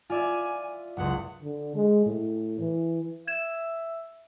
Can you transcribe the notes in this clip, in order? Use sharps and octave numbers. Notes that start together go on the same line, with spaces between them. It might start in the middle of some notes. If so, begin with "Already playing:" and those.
F4 D5 E5 G#5
F#1 C#2 F#5
D3
G#3
A2
E3
E5 G#6 E7